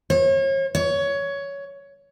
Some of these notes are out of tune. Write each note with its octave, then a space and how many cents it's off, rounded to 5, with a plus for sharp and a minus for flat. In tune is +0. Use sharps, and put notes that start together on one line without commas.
C#5 -40
C#5 +15